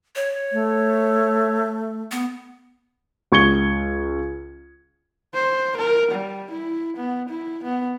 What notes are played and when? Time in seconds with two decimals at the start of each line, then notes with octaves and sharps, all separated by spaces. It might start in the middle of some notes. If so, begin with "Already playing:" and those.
0.16 C#5
0.52 A3
2.11 B3
3.32 C#2 C#6 G#6 C#7 G7
5.34 C5
5.77 A#4
6.11 G3
6.51 E4
6.97 B3
7.29 E4
7.63 B3